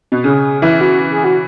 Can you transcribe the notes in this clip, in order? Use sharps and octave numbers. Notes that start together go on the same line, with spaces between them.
B2
C#3 G#4
E3 E4
F#4
G#4
F#4